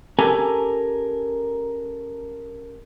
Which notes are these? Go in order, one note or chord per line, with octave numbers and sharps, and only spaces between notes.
C#4 G4 A4 A#4 G#5 A#5